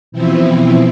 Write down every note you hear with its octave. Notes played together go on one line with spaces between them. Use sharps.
B2 E3 F3 C4 E4